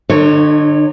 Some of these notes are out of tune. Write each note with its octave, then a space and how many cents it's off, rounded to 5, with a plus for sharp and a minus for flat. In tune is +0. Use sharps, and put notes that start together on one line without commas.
D3 +35 D#4 -25 C#5 +0